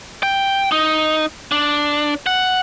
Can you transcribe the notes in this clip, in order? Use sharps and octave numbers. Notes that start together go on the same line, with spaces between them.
G5
D#4
D4
F#5